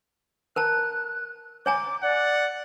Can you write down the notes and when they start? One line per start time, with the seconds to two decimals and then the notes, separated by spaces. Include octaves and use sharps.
0.56 A#4 A5 A#5 F#6
1.66 C#5 G#5 A#5 D6
2.03 D5 F#5